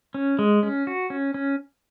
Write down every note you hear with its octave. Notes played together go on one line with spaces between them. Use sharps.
C#4
G#3
C#4
F#4
C#4
C#4